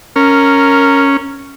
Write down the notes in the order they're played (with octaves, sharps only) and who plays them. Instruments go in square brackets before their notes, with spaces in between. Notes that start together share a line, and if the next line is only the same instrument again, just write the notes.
[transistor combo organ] C#4 [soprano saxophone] A#4